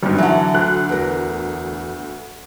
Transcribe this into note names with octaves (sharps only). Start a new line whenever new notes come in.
G#1 G2
D3 E3 F#3 F#4
D2 F#6
E2 A#4